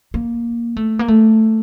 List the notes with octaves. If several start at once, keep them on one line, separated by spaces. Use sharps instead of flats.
A#3
A3
A#3
A3